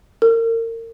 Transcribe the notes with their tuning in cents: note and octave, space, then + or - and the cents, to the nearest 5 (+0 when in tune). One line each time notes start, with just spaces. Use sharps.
A#4 -35